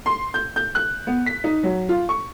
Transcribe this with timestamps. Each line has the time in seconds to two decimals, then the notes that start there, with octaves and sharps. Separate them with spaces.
0.06 C6
0.34 G6
0.56 G6
0.75 F#6
1.07 B3
1.26 B6
1.44 D#4
1.63 F#3
1.89 F4
2.09 C#6